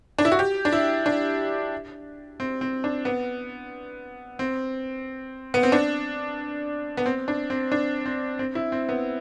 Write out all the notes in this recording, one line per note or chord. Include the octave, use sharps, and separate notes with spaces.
D4
E4
F#4
G4
D4
E4
D4
C4
C4
D4
B3
C4
B3
C4
D4
B3
C4
D4
C4
D4
C4
C4
E4
C4
B3